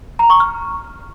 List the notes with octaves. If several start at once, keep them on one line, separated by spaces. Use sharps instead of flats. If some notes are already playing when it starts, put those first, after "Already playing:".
A#5
C#6
F6